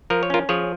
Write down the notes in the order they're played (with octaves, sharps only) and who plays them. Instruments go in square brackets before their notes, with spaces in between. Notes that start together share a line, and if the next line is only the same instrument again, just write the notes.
[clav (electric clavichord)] F3 A#4
C#5
C#4 F4 A#4
F3 G#4 C#5